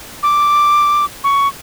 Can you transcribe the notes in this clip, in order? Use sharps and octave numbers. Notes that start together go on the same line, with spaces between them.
D6
C#6